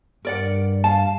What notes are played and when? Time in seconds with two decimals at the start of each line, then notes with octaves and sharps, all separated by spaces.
0.25 G2 A#4 D5 F#5
0.84 F5 A5